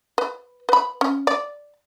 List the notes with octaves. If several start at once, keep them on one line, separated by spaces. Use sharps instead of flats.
B4
B4 B5
C#4
D5